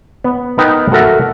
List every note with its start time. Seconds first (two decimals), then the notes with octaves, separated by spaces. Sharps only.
0.24 B3
0.58 B3 D#4 A#4 B4 G5 A#5
0.92 F#4 A4 A#4 E5 F#5